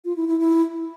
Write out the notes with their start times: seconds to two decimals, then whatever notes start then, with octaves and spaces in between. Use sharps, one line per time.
0.05 F4
0.16 E4
0.28 E4
0.39 E4